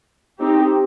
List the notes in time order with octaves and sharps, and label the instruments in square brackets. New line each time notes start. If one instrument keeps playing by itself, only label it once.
[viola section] C4 D#4 G4